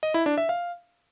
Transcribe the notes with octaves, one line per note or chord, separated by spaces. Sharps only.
D#5
E4
D4
E5
F5